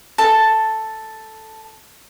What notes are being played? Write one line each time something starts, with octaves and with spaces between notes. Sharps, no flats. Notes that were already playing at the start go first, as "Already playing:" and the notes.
A4 A5